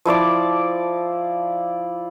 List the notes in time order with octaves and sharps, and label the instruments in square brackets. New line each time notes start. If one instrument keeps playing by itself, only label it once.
[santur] F3 E4 D5 D6